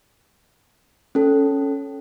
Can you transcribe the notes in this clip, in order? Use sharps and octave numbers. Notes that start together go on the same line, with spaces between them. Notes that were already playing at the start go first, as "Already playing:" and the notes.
C#4 A4